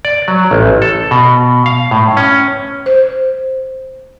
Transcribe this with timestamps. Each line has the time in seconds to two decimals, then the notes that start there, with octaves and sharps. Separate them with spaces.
0.05 D5
0.28 F#3
0.51 A1
0.82 A4
1.11 B2
1.66 F5
1.91 A2
2.17 C#4
2.86 C5